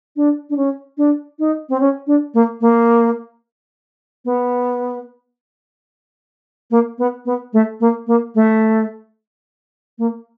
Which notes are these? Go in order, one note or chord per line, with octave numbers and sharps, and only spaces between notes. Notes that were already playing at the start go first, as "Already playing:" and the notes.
D4
D4
C#4
D4
D#4
C4
C#4
D4
A#3
A#3
B3
A#3
B3
B3
A3
A#3
A#3
A3
A#3